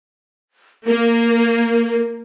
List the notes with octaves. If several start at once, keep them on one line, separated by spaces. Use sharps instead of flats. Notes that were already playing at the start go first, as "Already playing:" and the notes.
A#3 A#4